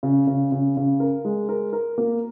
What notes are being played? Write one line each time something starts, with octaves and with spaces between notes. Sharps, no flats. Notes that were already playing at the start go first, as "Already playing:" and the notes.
C#3
C#3
C#3
C#3
A#4
G#3
A#4
A#4
A#3